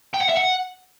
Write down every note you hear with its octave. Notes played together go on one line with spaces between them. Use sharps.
G5
F#5
E5
F#5